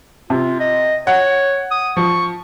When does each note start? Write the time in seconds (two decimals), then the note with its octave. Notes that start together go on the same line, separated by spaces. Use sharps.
0.30 C3 F4
0.60 D#5
1.07 C#5 F#5
1.71 D#6
1.97 F3 C#6